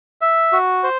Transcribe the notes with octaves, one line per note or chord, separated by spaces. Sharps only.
E5
F#4
C5